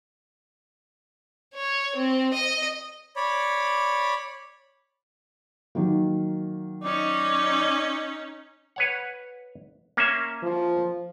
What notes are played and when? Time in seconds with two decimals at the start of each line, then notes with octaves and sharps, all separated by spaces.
1.55 C#5
1.96 C4
2.33 D#5
3.16 C#5 D5 B5
5.75 D#3 F#3 A#3
6.83 C#4 D#4 D5
8.76 B4 C#5 F#5
9.97 A#3 C#4 E5
10.43 F3